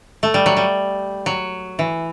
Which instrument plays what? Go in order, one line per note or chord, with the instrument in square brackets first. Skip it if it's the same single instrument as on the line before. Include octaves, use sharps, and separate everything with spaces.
[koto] A3
G3
F#3
G3
F#3
E3